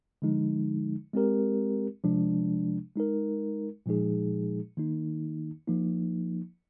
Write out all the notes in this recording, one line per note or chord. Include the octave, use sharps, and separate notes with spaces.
D3 F3 G#3 D#4
G#3 C4 G4 A#4
C3 F3 G#3 D4
G#3 D#4 A#4
A#2 F3 G#3 D#4 G#4
D#3 A#3 D#4
F3 A#3 D#4